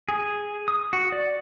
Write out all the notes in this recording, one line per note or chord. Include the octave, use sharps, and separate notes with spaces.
G#4
D#6
F#4
D5